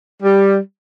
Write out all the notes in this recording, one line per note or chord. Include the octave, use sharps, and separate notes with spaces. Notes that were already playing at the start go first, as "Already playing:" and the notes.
G3